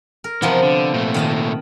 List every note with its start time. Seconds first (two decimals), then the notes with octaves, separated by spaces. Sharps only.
0.24 A#4
0.42 C3 E3 F3 B3 A#4
0.62 D3
0.94 A#2 A3
1.14 D#3 D#5 A5